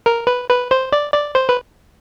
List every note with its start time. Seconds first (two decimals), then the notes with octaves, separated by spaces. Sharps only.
0.06 A#4
0.27 B4
0.50 B4
0.71 C5
0.92 D5
1.14 D5
1.35 C5
1.49 B4